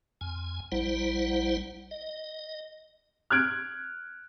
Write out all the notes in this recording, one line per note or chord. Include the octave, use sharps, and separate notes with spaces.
F2 G#5
A#1 G3 E4 C5 F#5
D#5
F6 F#6 G#6 D7